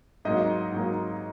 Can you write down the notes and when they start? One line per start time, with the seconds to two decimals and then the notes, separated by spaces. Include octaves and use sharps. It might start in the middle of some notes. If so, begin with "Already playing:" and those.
0.25 G#2 F#3 A#3 D#5
0.72 G#2 F#3 A#3